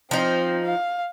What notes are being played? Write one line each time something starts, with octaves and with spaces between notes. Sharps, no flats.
F3 C4 D#4
F5